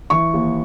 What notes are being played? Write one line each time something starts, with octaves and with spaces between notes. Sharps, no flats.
E3 C#6
D#2